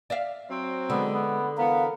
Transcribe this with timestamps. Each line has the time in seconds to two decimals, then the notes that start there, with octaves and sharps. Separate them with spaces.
0.10 D5 E5 F5
0.50 F#3 C4
0.90 D3 G#3 B3
1.13 B3
1.58 E3 B3 A#4 F5